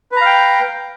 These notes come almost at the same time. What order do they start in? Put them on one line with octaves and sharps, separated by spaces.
B4 A#5 F5 G5